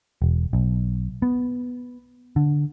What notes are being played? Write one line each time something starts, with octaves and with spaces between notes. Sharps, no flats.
E1
B1
B3
D3